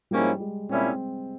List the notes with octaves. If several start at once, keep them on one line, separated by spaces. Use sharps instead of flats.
G#2 F3 G3 A#3 C#4 E4
G#3
A#2 G3 C4 C#4 E4